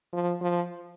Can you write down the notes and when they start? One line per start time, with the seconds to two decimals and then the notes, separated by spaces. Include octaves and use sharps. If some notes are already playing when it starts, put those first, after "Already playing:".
0.13 F3
0.41 F3